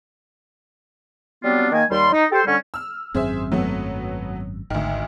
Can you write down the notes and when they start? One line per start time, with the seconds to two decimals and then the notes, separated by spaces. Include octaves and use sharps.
1.43 F#3 G3 B3 C4 D4 F4
1.72 D#3 A#3 G#5
1.90 D#2 G3 C6
2.12 D#4
2.32 G4 A4 C5
2.46 D3 G3 C#4
2.74 E6 F6
3.15 G#1 F#2 C4 G#4 C5 E5
3.52 F#3 A3 B3
4.70 G#1 D2 D#3